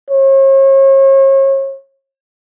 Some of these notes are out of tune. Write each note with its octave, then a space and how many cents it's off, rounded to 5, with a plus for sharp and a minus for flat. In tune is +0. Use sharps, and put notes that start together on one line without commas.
C#5 -40